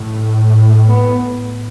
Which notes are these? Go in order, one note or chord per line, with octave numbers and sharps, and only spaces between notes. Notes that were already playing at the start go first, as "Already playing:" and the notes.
Already playing: A2
B3